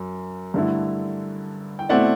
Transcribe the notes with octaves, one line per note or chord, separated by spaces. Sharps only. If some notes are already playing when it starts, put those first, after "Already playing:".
Already playing: F#2
G2 D3 A3 E4
G5
B2 A3 C4 E4 D5 F#5